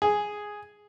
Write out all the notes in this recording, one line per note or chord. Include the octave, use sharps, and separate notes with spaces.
G#4